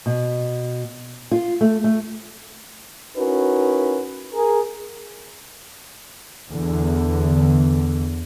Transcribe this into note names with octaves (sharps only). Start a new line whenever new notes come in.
B2
F4
A3
A3
C#4 D#4 E4 F#4 A#4 B4
G#4 A#4
E2 D3